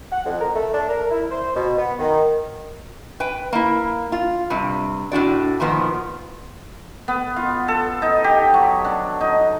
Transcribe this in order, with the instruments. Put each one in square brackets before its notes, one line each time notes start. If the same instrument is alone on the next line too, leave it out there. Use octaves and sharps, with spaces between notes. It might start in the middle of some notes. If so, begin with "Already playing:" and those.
[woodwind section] F#5
F2
A#4
A3
D4
A#4
E4
C5
B2
B3
D#3
[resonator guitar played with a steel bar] B4 G5
A#3 E4
F4
G2 C3
A2 D4 F#4 D5
A#2 D#3 F3 B3
[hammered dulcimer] B3
F4
A4
D#4
G4
F#3
D4
D#4